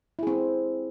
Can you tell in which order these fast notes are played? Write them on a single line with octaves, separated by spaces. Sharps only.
E4 G#4 C4